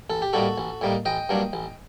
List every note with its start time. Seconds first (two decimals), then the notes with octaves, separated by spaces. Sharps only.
0.10 A1 A4
0.22 G4
0.33 A2 G3 A#3 D#4 F#4 A4
0.58 A1
0.81 A2 G3 A#3 D#4
1.05 A1 D#5 G5
1.29 G2 F#3 A#3 D4
1.53 A1